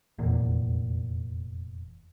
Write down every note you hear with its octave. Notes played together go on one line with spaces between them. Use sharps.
F1 E2 A#2